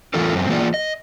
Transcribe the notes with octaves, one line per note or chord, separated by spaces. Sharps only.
E2 A2 E3 F4 A4 A#4
F#2 C4
E3 A#3 F4 G#4 D5
D#5